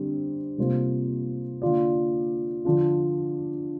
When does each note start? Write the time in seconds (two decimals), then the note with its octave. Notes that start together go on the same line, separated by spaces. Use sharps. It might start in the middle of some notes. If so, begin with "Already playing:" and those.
Already playing: D3 G3 C4 G4
0.58 C3 G3 A#3 F4 C5
1.62 D3 A#3 F4 D5
2.65 D3 F3 D4 F4